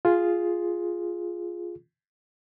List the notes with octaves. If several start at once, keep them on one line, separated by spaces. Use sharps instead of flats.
F4 G#4